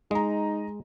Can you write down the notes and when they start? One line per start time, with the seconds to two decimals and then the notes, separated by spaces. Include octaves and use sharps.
0.11 G#3 D#4 D#5 A#5